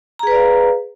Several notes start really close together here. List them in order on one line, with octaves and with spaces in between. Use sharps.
A#5 G#4 B4 D5 F5